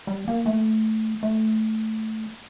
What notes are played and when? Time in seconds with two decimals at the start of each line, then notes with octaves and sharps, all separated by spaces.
0.07 G3
0.28 A#3
0.46 A3
1.23 A3